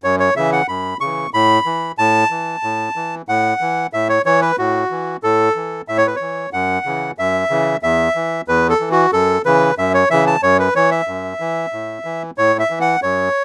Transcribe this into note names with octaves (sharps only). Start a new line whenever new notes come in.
F#2 C#5
C#5
C#3 E3 E5
F#5
F#2 B5
C#3 E3 C#6
A2 B5
E3
A2 A5
E3
A2
E3
A2 F#5
E3
A2 E5
C#5
E3 C#5
B4
A2 F#4
E3
A2 A4
E3
A2 E5
C#5
B4
E3 C#5
F#2 F#5
C#3 E3
F#2 E5
C#3 E3
E2 E5
E3
E2 B4
A4
E3
F#4
F#2 A4
C#3 E3 B4
F#2 E5
C#5
C#3 E3 E5
A5
F#2 C#5
B4
E3 C#5
E5
F#2
E3
A2
E3
A2 C#5
E5
E3
F#5
F#2 C#5